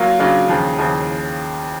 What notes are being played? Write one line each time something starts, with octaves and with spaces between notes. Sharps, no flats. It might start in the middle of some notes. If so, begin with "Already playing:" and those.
Already playing: F#3 A#3 F4
C#3 F#3 A#3 D4 F4
D#2 C#3 F3
D#2 C#3 F3